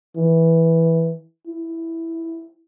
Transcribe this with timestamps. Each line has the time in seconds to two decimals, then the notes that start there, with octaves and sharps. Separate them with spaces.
0.17 E3
1.47 E4